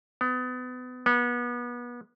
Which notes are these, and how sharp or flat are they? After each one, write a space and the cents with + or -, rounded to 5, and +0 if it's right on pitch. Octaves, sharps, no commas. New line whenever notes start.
B3 +30
B3 -30